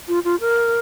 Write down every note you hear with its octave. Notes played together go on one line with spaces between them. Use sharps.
F4
F4
A#4